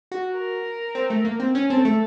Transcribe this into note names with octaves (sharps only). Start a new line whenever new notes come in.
F#4
A#4
C4
A3
A#3
C4
C#4
C4 A4
A3